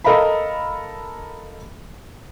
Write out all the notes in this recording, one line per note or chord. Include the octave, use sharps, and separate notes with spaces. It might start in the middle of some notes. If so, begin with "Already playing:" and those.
A4 A#4 D#5 F5 A#5 B5